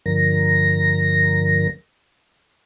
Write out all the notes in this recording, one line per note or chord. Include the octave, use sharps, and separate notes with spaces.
G2 D3 F3 A#4 A#6